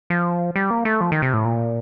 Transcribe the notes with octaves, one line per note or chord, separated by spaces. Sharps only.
F3
G3
A#3
A3
F3
D#3
C3
A2
A#2